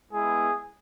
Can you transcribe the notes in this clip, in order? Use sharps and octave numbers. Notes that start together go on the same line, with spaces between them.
G#3 B3 E4 G#4